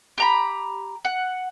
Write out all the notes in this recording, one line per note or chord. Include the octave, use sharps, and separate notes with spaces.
G4 A#5 B5
F#5